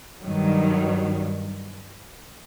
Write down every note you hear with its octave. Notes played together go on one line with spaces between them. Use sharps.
G2 D#3 F#3